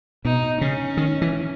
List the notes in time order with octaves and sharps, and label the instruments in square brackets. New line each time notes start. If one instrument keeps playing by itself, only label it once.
[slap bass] B2 [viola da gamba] D#4
[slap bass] C#3 [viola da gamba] C#4
[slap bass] D#3
E3